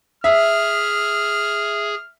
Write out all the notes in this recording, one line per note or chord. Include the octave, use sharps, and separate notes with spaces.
G#4 E5 F6